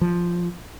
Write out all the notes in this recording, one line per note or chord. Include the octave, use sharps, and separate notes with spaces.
F3